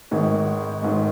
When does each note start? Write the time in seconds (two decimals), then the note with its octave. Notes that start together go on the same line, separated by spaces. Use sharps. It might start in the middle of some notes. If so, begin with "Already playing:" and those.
0.11 G#1 G#2 D#3
0.82 G#1 G#2 D#3